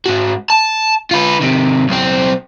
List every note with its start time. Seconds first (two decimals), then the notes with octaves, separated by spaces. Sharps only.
0.06 G#2 F#4
0.50 A5
1.11 F4 B4
1.40 C3 D#3
1.89 B1 C4